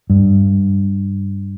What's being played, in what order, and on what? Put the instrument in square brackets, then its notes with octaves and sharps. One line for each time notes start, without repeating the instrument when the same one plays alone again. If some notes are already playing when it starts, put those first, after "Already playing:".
[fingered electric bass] G2